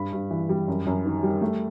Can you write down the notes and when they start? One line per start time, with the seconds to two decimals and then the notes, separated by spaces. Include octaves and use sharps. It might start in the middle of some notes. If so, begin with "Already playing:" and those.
Already playing: G2 B5
0.13 G2
0.31 E3
0.49 G3
0.68 F#2
0.87 F#2
1.04 D#3
1.23 G3
1.42 A3